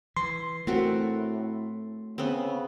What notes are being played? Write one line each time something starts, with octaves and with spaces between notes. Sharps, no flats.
E3 C6
A2 A3 C4 F#4 A#4
C#3 B3 C4